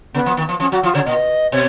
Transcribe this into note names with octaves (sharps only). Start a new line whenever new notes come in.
C#3 B3
F3
D#3
F3
F3 C#4
F#3 F#4
F3 F4
C#3 C#5
A#2 D#5
B2 C#5